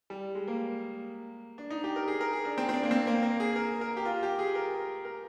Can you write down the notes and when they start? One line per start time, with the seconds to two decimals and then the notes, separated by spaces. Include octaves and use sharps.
0.10 G3
0.35 G#3
0.48 A#3
1.58 D4
1.70 D#4
1.84 G4
1.96 A#4
2.08 G#4
2.21 A#4
2.33 G#4
2.45 D4
2.58 C4
2.69 C4
2.74 D4
2.83 A#3
2.91 C4
3.07 A#3
3.23 A#3
3.40 G#4
3.56 A#4
3.81 A#4
3.97 G4
4.05 F4
4.23 G4
4.39 G#4
4.55 A#4
5.05 A#4